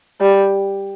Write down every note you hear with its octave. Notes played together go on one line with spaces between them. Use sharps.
G3